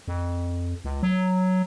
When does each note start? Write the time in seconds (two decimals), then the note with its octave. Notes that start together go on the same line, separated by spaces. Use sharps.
0.08 F2
0.85 C#2
1.03 F#3